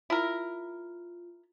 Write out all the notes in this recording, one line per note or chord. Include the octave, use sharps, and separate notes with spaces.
E4 F4 A#4